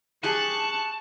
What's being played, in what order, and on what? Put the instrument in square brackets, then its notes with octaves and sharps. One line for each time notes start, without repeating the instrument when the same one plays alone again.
[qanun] G4 G#4 G5 [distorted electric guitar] A5 [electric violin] C#6 F#6